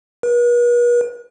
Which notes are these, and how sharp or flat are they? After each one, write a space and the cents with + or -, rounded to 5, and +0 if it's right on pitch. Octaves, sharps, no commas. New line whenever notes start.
B4 -45